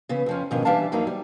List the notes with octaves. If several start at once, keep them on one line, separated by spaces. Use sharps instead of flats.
C#3 E3 B3
F2 F3 C#4
G#2 B2 D#3 F3 C#4 D4
E3 G3 D4 E5 F5 A5
F2 F#3 A#3 D#4
G3